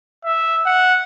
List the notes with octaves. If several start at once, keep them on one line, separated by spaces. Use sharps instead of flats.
E5
F#5